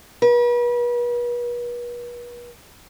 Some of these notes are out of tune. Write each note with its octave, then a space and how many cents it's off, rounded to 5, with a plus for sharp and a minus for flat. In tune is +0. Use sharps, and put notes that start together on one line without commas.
B4 -40